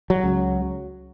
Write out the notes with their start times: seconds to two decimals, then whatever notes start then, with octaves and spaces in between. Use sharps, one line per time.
0.10 F#3
0.23 C#2 C#3